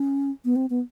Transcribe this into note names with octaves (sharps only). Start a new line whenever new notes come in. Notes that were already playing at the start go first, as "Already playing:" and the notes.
Already playing: C#4
B3
C4
B3